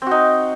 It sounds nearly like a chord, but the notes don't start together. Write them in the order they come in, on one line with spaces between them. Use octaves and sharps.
C4 F#4 D#4